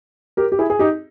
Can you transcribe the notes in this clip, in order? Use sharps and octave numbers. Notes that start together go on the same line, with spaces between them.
G4 A#4
G4
E4 G#4
G#4
D#4 G4